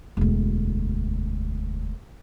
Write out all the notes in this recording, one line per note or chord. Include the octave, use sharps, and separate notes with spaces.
E1 D2